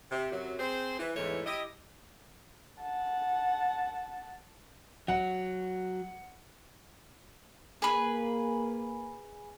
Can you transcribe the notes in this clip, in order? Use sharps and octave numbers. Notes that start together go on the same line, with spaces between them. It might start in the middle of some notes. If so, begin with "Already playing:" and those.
C3
F#2 C3 F#3
C4 G#4 C5
E3
E2 G#2 E3 A3 C#5
E4 G4 D#5
F#5 A5
F#3 F#5
A#3 G#4 B4